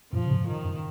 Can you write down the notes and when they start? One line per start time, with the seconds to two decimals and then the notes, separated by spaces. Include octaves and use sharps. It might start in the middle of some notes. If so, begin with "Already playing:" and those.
0.13 F#2 A#2 F3
0.25 C#3
0.29 G#2 C3
0.48 D#3
0.65 F#2